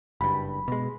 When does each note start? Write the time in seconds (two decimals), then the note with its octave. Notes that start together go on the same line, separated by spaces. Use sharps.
0.21 F#1 G2 B5
0.68 B2 G#3